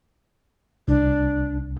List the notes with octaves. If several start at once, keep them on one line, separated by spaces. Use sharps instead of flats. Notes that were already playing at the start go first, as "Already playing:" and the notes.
C2 D4